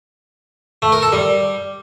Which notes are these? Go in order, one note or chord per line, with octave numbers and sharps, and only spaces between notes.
A3
A#4
A4
G3